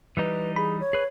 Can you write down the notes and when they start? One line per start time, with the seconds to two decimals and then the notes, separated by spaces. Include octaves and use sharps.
0.17 E3 G3 D#4 B4
0.56 G#4 B5
0.80 C#5
0.93 G#4 B4